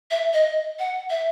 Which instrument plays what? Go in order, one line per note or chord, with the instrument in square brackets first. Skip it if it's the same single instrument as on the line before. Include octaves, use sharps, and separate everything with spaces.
[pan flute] E5
D#5
F#5
E5